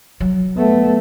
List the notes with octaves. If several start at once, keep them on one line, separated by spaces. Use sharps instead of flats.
F#3
A3 B3